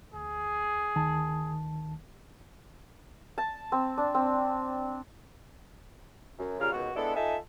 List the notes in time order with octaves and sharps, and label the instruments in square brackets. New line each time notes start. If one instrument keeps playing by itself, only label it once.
[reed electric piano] D2 [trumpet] G#4
[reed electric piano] D2 D#3 A5
[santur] A5
C4
D4
C4
[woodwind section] F#2
C#3 G3 F4 A#4 F6
C#2 B2 D#3 F#4
G#3 B3 D4 E4 A4
D#4 F4 A4 E5 G#5 A5